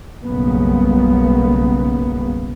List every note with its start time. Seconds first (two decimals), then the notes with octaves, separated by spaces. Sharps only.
0.24 B1 F#2 C#3 G3 A#3 B3